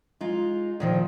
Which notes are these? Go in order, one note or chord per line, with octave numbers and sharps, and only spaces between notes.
G#3 D#4 F4
A#2 D#3 F3